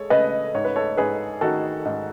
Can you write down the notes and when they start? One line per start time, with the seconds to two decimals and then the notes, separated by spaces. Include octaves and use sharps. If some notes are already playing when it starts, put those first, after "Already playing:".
Already playing: G#3 A4 C#5
0.10 C#3 B4 D#5
0.55 G#2 C#5
0.65 B4
0.76 A4 C#5
0.97 G#2 G#4 B4
1.41 D#3 F#4 A4
1.85 G#2